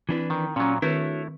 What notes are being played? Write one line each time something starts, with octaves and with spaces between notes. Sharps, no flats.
E3 C4 D4 E4 B4
D#3
A#2 F#3 C#4
D#3 A3 C4 D4 E4 F#4 B4 C#5